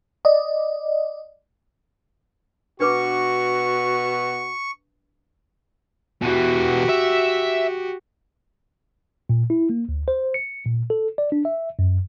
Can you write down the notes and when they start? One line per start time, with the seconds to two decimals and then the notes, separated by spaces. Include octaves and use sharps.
0.25 D5 D#5
2.80 B2 D4 F#4 B4 C#6 D6
6.22 B2 E3 F#4 G4
6.89 E5
9.29 A#2
9.50 E4
9.70 A#3
9.89 D2
10.08 C5
10.34 C#7
10.66 A#2
10.90 A4
11.18 D5
11.32 D4
11.45 E5
11.79 F#2